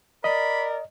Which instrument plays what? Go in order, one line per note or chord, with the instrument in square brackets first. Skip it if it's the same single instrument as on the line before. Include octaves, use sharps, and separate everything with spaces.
[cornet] A#4 [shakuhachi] D5 [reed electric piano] D#5 [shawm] B5